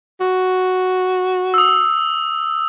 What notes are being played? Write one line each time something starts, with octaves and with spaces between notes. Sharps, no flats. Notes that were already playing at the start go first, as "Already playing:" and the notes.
F#4
D#6 E6